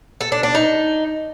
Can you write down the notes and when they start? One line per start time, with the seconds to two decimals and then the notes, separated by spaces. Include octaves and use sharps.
0.21 A4
0.32 D4
0.43 D4
0.55 D#4